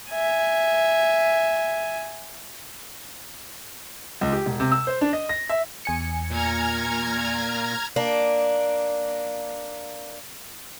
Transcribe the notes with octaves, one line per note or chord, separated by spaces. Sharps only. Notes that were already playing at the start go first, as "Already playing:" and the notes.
E5 G#5
C#2
G4
E1
C3
E6
C5
D4
D#5
A#6
E5
E2 G#5 C#7
A#2 A#5 F6 G#6
A#3 D4